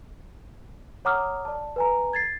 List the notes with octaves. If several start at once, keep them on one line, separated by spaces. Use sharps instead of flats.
C#5 F#5 A#5 D6 D#6 F6
D5 A5
B4 G#5 A#5
G#6 A6 C7